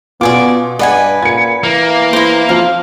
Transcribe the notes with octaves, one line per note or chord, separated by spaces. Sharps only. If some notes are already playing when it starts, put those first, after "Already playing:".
B2 B3 F4 D5 G#5 D6
G2 B4 D5 D#5 F#5 G#5
A#2 G#6 C#7
E3 A#3
E4 C5
F3 C4 F4 F5